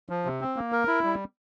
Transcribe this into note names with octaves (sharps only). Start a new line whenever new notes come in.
F3
C3
C4
A#3
A#4
E4
G3